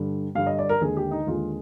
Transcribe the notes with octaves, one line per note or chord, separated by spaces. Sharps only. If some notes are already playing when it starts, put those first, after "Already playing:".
Already playing: G2 D3 G3
G2 D3 G3 F5
D#5
D5
A#4
D#2 D3 G#3 G#4
G4
D#4
D#2 D3 G#3 F4